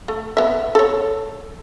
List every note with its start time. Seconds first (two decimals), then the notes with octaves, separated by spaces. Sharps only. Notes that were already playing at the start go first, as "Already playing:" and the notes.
0.08 A3
0.37 B3 E5
0.75 A4 C#5